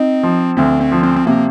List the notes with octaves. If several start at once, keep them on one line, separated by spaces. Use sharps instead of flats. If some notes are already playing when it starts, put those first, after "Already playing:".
Already playing: C4 D#4
F3
D2 C4
C4
F3
C4
C4
C3 A#3